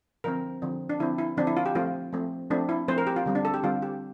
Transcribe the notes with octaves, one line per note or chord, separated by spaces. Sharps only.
D3 F3 C4 A#4
D3 F3 C4
D4
D3 F3 C4 E4
E4
D3 F3 C4 D4
E4
F4
G4
F3 A3 C4 F4
F3 A3 C4
F3 A3 C4 D4
E4
F3 A3 C4 C5
A#4
G4
F4
D3 G3 C4
D4
A4
G4
D3 G3 C4 F4
G4